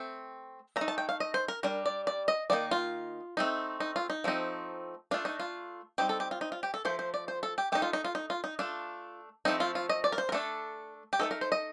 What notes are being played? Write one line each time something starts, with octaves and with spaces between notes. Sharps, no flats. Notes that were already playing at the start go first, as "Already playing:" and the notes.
Already playing: A3 C4
A3 A#5
D#4
A5
G5
F5
D#5
C5
A#4
G3 D4 A#4
D5
D5
D#5
D#3 A#3 D#4 D5
F4
A3 C4 D#4
D#4
F4
D#4
F3 A3 C4 D#4
A3 D4 F4
D#4
F4
G3 C4 D#4 G4
A4
G4
F4
D#4
F4
G4
A4
F3 A3 C5
C5
D5
C5
A4
G4
A3 D#4 G4
F4
D#4
F4
D#4
F4
D#4
A3 D4 F4
F3 A3 C4 D#4
F4
F4
D#5
D5
A#4
C5
A#4
A3 D4 A4
G4
A3 C4 D#4 A4
A#4
C5
D#5